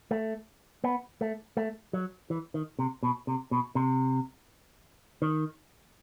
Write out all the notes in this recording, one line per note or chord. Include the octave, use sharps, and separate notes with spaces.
A3
B3
A3
A3
F#3
E3
D#3
C3
B2
C3
B2
C3
D#3